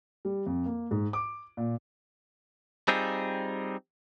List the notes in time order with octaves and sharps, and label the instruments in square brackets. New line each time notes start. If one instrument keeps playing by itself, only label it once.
[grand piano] G3
F2
A#3
G#2
D6
A#2
[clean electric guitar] G3 C4 D#4 F4 G#4